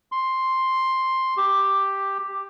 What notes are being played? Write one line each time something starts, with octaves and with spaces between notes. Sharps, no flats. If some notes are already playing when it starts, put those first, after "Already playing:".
C6
G4